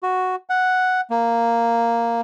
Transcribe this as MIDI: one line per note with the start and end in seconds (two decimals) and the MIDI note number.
0.03 0.36 66
0.50 1.01 78
1.10 2.21 58